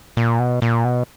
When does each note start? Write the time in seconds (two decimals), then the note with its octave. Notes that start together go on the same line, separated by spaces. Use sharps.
0.17 A#2
0.39 B2
0.62 A#2
0.85 B2